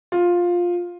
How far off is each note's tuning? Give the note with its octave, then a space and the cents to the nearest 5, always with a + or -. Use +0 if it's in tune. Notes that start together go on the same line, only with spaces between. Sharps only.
F4 +10